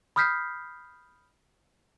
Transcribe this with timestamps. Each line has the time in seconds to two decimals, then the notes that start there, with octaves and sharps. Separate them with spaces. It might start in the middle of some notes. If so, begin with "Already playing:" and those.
0.16 B5 D#6 F6 G6 B6 C7